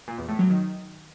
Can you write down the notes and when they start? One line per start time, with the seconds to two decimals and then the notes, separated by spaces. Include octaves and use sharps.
0.08 A#2
0.18 E2
0.29 A2
0.39 F#3
0.49 D#3